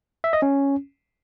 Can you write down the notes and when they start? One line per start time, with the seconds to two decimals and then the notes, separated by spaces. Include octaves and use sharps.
0.24 E5
0.33 D#5
0.42 C#4